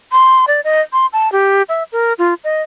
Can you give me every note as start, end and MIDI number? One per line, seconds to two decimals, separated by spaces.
0.12 0.45 84
0.48 0.61 74
0.64 0.81 75
0.93 1.06 84
1.13 1.31 81
1.32 1.63 67
1.69 1.83 76
1.92 2.13 70
2.19 2.34 65
2.44 2.62 75